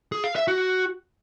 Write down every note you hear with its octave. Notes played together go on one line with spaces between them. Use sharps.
G#4
F5
E5
F#4